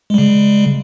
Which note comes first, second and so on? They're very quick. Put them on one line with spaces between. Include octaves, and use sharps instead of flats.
G#3 G3 C#3